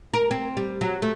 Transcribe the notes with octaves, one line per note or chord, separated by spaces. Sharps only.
A#4
C4
G3
F#3
A3